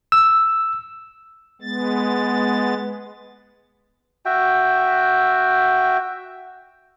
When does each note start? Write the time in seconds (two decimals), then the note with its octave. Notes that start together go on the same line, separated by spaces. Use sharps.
0.12 E6
1.62 G#3 B3 A6
4.25 F#4 E5 G5